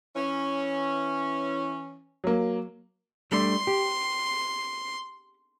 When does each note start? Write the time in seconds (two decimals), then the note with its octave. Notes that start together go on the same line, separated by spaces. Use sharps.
0.16 E3 C#4
2.24 F#3 A#3
3.32 G3 A3 D4 C6
3.67 G4